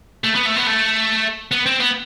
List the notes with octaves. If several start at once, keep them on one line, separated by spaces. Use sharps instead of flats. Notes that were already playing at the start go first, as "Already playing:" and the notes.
A3
B3
A3
B3
A3
B3
C4
B3